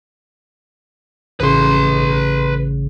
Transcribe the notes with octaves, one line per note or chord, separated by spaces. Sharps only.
A1 C#3 B4 C6